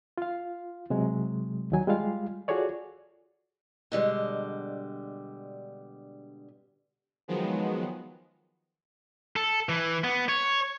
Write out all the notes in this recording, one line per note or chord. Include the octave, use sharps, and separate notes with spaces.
F4 F5
C3 F#3 G#3
D#2 D#3 F#3 G#5
G3 G#3 F4 F5
F4 F#4 G#4 A4 C#5 D5
B2 D3 G3 G#3
D#3 F3 F#3 G#3 B3
A4
E3
B3
C#5